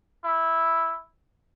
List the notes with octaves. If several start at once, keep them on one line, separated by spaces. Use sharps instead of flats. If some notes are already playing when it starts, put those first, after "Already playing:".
E4